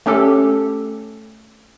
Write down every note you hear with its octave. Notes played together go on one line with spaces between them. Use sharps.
A3 C#4 G4 A4